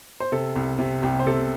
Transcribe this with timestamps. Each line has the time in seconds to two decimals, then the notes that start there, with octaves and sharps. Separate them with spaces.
0.20 C5
0.32 C3 A4
0.56 C2
0.79 C3
1.02 C2 G4
1.20 C5
1.26 C3 A4